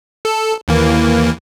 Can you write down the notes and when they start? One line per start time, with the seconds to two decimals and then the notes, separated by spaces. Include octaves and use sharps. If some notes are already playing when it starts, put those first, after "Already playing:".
0.25 A4
0.68 D#2 E3 A#3